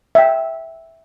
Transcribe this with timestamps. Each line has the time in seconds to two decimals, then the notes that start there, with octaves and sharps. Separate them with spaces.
0.15 E5 G5